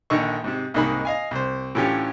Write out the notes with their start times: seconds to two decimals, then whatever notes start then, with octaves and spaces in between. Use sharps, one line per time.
0.10 A#1 D3 D#3 A4 D#5 C#6
0.44 G#2 C3
0.74 C2 G#2 A#3 D#4 G#5 B5
1.05 D#5 F5 G#5
1.31 C2 C5
1.75 A2 D3 E3 C#4 F4 G4